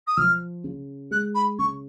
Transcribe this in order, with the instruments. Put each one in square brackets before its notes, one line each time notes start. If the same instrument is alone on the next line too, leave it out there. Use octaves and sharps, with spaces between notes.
[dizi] D#6
[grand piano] F3 [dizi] F6
[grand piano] C#3
[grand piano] G#3 [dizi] F#6
[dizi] B5
[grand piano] C#3 [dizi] C#6